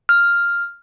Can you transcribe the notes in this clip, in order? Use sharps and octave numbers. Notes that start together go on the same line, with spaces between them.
F6